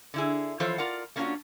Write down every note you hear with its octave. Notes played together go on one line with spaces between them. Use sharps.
D3 E4 G#4
E3 F3 F4 A4 C5 C#5
F4 A#4 D5 F#5
A3 A#3 C#4 D4 F4 F#4